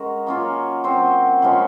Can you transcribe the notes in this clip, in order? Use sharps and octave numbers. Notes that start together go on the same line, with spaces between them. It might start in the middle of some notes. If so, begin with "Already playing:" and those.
Already playing: G#3 C#4 F#4 A#4
F#3 A#3 C#4 F4
F#3 C4 F#4 C5
C#3 F3 G#3 C#4